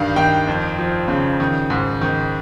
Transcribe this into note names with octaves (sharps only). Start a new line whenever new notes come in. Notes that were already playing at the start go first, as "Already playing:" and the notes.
Already playing: G2 D#3 F5
D#3 G5
F2
F3
C#3
D#3
G#2
D#3